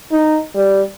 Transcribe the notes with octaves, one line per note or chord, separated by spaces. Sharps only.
D#4
G3